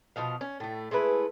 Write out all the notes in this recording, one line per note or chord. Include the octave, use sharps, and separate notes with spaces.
B2 F3 D#4 F5
C#4
A2 A3
G#3 A3 E4 B4